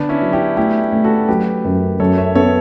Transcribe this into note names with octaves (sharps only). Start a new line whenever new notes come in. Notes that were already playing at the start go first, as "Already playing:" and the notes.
Already playing: D3 B3 D4
C#4 E4
F#3
E4 G4
A3 E4 G4
A3
F#4 A4
F#3 G4 B4
F#2
F#2 A4 C#5
C#5 E5
B3 A4 C#5